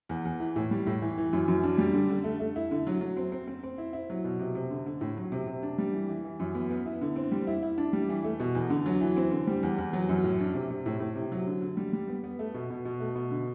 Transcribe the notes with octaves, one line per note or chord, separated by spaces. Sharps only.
E2
E2
E3
A2
G3
A2
E3
E3
F#2
F#2
D4
G3
D3
D3
A3
A3
E4
D3
F#3
F#3
C4
C4
C4
C4
E4
E4
F#3
B2
C3
C3
D3
D3
A2
F#3
C3
C3
D4
G3
E3
E3
E3
F#2
B3
B3
E4
D3
C4
G3
E4
E4
D4
G3
E3
A3
B2
E2
D3
F#3
E3
C4
D3
G3
E2
E2
F#3
F#2
A2
D4
C3
C3
A2
A2
C3
F#3
D3
D3
G3
G3
B3
B3
A3
B2
B2
B2
A3
B2
D3